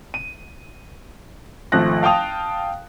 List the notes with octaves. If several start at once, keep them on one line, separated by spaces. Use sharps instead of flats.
D#7
G#1 F3 A3 F#6 A#6
F5 G5 A5 D#6 F7